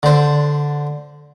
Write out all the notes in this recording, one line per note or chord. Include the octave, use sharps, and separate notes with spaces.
D3 C5